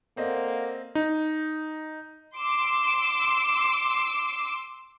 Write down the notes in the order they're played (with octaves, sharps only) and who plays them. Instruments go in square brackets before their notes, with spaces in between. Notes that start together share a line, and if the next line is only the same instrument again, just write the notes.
[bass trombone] A#3 [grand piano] C4 D#5 [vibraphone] A4 D5 F#5
[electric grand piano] D#4
[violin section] C6 D6 E6